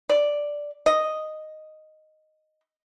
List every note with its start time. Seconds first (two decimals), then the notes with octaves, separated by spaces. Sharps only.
0.09 D5
0.86 D#5